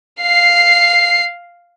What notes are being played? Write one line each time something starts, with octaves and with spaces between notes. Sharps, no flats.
F5 C7